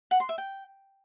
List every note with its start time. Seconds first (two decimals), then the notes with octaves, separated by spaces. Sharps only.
0.11 F#5
0.20 C6
0.29 E5
0.38 G5